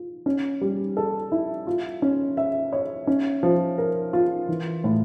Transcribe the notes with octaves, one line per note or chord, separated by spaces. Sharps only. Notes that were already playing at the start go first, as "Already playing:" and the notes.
Already playing: F4
C#4
G3
A4
E4
F4
C#4
E5
C#5
C#4
F3
A#4
F4
E3
A2